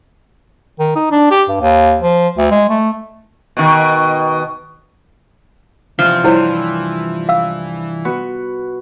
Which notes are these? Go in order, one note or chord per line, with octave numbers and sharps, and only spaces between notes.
D#3
D#4
D4
G4
G2
D#2
F3
D2
G#3
A3
B2 D#3
E2 C3 E3 F3 C4
G2 E3 E4 F4 C5 C#5
F5 E6
B3 F#4 B4